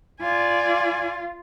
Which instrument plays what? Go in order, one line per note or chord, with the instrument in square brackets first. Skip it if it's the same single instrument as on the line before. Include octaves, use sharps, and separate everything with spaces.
[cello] F4 [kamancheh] D5 G#5